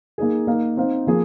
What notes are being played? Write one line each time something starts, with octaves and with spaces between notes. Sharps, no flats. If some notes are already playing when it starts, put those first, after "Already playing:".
A#3 D#4 G#4
A#3 D#4 A#4 F5
C4 D#4 C5 F5
F3 A#3 G#4